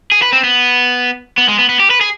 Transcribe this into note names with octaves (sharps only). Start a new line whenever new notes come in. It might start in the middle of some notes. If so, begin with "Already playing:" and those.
G#4
B4
C4
B3
B3
G#3
B3
B3
G4
B4
G#4